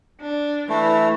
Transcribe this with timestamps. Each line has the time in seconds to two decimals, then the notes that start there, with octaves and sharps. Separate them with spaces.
0.20 D4
0.69 E3 A3